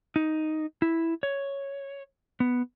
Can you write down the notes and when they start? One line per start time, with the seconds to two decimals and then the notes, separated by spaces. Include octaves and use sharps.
0.16 D#4
0.82 E4
1.23 C#5
2.40 B3